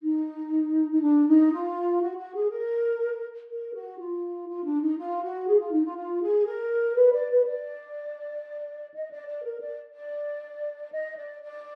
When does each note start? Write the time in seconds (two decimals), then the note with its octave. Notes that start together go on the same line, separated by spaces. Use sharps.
0.03 D#4
0.90 D#4
1.01 D4
1.27 D#4
1.51 F4
2.01 F#4
2.17 F#4
2.34 G#4
2.50 A#4
3.49 A#4
3.74 F#4
3.99 F4
4.48 F4
4.65 D4
4.81 D#4
4.98 F4
5.23 F#4
5.47 G#4
5.60 F4
5.72 D#4
5.85 F4
5.97 F4
6.22 G#4
6.46 A#4
6.96 B4
7.12 D5
7.28 B4
7.45 D5
8.94 D#5
9.10 D5
9.27 D5
9.43 A#4
9.60 D5
9.93 D5
10.92 D#5
11.16 D5
11.42 D5